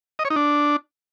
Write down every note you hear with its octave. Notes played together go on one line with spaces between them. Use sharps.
D#5
C#5
D#4
D4